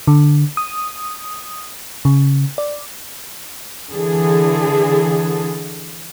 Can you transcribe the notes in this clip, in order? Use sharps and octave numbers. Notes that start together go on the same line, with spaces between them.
D3
D#6
C#3
D5
D3 E3 G#4 A4